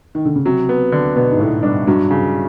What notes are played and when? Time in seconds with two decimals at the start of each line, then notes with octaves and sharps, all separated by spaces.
0.15 D#3
0.25 D3
0.36 C#3
0.45 C3 F#3
0.69 B3
0.92 D3
1.16 B2 B3
1.32 G#2
1.39 A2 B3
1.63 G2 D4
1.87 G2 F#3
2.11 C#3